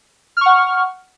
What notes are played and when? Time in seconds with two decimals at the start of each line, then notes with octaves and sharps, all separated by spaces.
0.37 F6
0.41 C#6
0.46 F#5